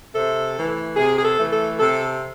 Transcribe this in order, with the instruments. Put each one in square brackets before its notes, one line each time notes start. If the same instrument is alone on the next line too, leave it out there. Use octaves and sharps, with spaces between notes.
[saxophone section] C3 A4
E3 A3
C3 G#4
G#4
A4
E3 A3
A4
C3 A4